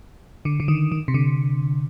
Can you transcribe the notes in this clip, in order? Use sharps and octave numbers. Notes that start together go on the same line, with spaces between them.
D3
D3
D#3
D#3
C3
D3